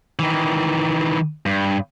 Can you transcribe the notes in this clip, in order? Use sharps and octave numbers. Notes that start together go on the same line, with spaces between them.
D#3 E3
G2